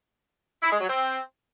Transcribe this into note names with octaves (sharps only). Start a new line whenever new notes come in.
E4
G#3
F#3
C4